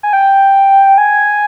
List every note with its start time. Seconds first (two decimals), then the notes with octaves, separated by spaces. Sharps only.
0.03 G#5
0.13 G5
0.98 G#5